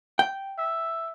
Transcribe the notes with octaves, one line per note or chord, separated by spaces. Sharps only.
G5
E5